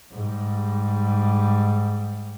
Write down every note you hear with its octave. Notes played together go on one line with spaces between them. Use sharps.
G#2 G3